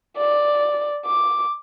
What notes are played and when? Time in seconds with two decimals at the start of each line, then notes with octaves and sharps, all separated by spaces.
0.17 D5
1.06 D6